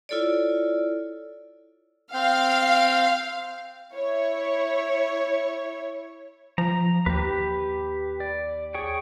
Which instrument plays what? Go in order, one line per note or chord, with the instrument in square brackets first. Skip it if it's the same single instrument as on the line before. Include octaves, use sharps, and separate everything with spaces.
[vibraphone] E4 F4 A4 C#5 D5
[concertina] C4 G5 [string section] F5
[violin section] E4 C#5
[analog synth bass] F3 [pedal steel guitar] A#5
[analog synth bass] D#2 [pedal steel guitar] G4 B4
[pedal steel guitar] D5
G#4 C#5 G5